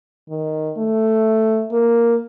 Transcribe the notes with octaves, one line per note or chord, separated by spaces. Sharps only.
D#3
A3
A#3